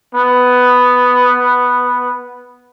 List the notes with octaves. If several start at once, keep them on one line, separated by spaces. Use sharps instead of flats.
B3